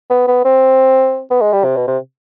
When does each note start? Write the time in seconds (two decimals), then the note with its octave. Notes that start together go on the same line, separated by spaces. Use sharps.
0.10 B3
0.27 B3
0.44 C4
1.30 B3
1.41 G#3
1.53 G3
1.64 C3
1.76 B2
1.87 C3